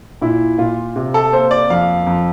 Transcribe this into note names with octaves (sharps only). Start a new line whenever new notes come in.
A#2 E4
A#2 F4
C3
A4
A#3 C5
D5
F2 F5
F2